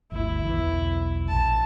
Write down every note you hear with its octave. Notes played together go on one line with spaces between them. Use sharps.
G1 D2 E4
B1 E2 E3
A#1 A5